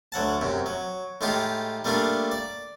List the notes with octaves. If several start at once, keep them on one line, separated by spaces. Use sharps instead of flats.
D2 F#3 F#5 A5
F#2 C3
F#3
A2 G#3 D#4 F4 G4
G3 A3 A#3 D4 F4
D5